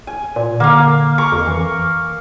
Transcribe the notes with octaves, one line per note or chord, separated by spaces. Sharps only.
G#5
A#2
D3 A#3 F5
A#4 C#6 D6
F2
E3